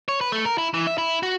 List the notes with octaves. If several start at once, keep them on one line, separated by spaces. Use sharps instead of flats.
C#5
B4
A3
A#4
E4
E3
E5
E4
F#4